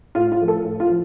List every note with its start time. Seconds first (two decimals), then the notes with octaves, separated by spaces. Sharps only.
0.15 A2 F4
0.32 F4
0.41 F3 A3
0.48 A4
0.64 A2
0.80 F4
0.89 F3